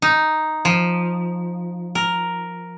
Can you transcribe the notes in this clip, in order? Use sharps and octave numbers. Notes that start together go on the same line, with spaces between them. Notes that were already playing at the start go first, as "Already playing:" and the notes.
D#4
F3
A#4